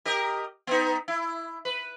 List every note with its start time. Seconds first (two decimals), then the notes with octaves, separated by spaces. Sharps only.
0.05 G4 A#4 D#5
0.67 B3 D#4
1.08 E4
1.65 B4